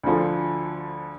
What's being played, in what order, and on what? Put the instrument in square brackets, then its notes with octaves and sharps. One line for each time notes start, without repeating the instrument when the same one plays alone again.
[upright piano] D2 D3 F3